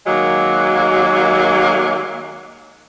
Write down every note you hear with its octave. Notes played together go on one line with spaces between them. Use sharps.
D#3 F#3 G#3 A#3